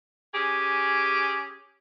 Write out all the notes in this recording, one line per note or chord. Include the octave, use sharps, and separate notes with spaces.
C#4 G4 G#4